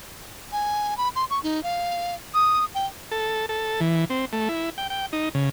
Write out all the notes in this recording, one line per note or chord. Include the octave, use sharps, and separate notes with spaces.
G#5
B5
C6
C#6
D#4
F5
D#6
G5
A4
A4
E3
C4
A3
E4
G5
G5
D#4
C#3